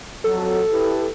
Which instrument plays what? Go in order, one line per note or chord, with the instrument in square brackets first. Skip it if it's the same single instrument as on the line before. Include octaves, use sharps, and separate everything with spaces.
[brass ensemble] F2 F#3 [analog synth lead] A4
[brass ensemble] E4 G4 B4